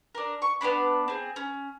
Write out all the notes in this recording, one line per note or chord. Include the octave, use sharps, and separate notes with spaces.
D4 A#4
C#6
B3 C4 D4 B5
C4 G#4
C#4